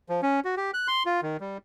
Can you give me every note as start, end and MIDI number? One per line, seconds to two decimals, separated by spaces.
0.09 0.21 53
0.22 0.40 61
0.45 0.55 66
0.57 0.71 67
0.74 0.88 90
0.88 1.03 84
1.06 1.21 65
1.22 1.37 51
1.40 1.58 55